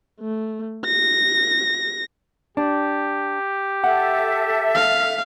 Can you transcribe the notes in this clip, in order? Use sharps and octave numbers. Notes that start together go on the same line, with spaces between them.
A3
A#6
D4 G4
A4 E5 F#5
F5